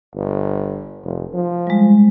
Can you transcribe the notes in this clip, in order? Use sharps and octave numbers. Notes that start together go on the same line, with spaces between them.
G1
F1
F3
G3 G#3